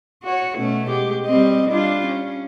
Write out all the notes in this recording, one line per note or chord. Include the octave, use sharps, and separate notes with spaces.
F#4 C#5
B2 A3 C#4
G#3 G4
G3 C4 D#5
G3 D4 F4
C#4